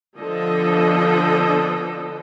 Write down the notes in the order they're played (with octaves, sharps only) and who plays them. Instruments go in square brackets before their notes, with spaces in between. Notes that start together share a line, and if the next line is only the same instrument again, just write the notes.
[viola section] D3 F3 B3 D4 A4 D#5